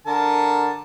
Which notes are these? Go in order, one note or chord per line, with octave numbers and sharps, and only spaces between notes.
D3 A#4 A5